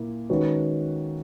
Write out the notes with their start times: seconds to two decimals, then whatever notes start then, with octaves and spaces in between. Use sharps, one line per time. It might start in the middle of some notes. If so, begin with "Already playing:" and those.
Already playing: A#2 A#3 E4
0.30 D#3 G#3 C#4 F#4 B4